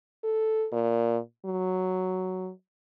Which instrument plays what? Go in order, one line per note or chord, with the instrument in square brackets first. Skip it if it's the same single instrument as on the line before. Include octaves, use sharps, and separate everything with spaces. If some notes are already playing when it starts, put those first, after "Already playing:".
[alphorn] A4
A#2
F#3